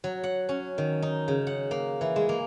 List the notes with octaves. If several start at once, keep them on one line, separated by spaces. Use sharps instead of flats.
F#3
F#5
C#4
D#3
D#4
C#3
F#5
A#3
E3
G#3
A#3